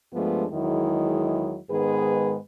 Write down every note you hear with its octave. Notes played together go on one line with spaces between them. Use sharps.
G2 F3 G#3 A3 B3 D4
E2 D#3 F#3 G#3 E4
G#2 D#3 G#3 B3 G#4 B4